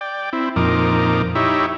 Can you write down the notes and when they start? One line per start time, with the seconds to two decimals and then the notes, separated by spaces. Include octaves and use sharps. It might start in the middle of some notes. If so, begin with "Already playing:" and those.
0.01 D5 G5
0.33 C4 E4
0.56 F2 A#2 F3 D#4 A#4 D6
1.35 D#4 E4 G4 C#5 E5